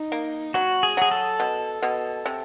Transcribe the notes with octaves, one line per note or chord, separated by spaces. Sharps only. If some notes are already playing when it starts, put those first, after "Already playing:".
Already playing: D#4
A#3
F#3 F#4
G#4
F#3 G#4
A4
B2
B2
C3